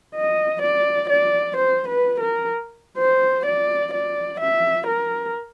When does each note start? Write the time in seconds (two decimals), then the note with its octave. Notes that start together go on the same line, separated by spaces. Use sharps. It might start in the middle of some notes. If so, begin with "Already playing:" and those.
0.15 D#5
0.62 D5
1.09 D5
1.57 C5
1.89 B4
2.20 A#4
2.98 C5
3.46 D5
3.93 D5
4.40 E5
4.88 A#4